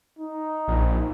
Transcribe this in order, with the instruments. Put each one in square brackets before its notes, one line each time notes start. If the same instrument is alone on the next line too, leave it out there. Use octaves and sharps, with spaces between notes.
[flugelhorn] D#4
[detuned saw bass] A#1